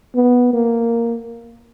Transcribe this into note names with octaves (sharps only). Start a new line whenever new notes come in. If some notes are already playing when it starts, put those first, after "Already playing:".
B3
A#3